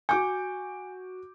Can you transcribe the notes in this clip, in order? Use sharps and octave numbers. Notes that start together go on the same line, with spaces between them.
F#4 G#5 D6 G6